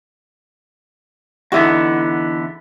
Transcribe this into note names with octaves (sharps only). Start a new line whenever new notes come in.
E2 D3 B3 D#4 E4 F#4